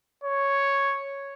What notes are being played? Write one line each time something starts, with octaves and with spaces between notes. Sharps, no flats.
C#5